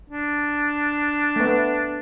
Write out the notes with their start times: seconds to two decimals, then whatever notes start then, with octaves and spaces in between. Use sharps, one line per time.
0.10 D4
1.36 A3 B3